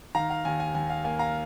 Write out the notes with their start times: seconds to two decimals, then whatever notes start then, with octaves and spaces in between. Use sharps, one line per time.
0.15 D#3 F5 A#5
0.30 F5
0.45 D#2 G#5
0.60 G#5
0.75 D#2 G#5
0.90 F5
1.04 A#3 G#5
1.19 F5 A#5